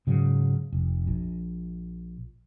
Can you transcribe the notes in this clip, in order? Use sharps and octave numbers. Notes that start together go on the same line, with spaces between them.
G#2 C#3 F#3
F1
A#1